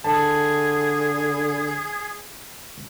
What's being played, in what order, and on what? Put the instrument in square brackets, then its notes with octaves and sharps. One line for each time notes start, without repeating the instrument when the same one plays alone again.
[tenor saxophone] D3 [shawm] G#4 [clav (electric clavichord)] A5